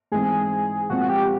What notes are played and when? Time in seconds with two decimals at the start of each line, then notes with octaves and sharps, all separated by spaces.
0.12 G#2 E3 G#3 C4 G#4
0.90 A#2 F3 G#3 C4 F#4
1.09 G4